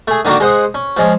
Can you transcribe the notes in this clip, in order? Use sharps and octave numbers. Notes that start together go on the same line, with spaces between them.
A3 G#4
D3 D#3 A#3 D4 F#4
G#3 C5 F#5 D#6
C#4
F3 G#3 C#4